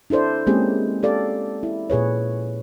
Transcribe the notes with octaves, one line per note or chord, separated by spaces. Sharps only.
D4 E4 A4 C5 D5
G#3 A#3 C4 C#4 G4 G#4
G4 A4 D5 F5
E4
A#2 G#4 B4 C#5